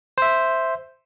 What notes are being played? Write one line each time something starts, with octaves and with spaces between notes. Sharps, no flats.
C5 E5